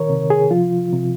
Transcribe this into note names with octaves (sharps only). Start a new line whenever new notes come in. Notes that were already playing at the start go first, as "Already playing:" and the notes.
Already playing: A#2 D#3 A#4 C#5
C3
G#4
F3 F4
C3